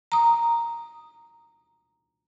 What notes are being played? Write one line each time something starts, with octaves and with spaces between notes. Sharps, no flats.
A#5 D#6